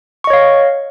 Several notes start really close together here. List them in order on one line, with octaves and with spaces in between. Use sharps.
C#6 D#5 C#5 F5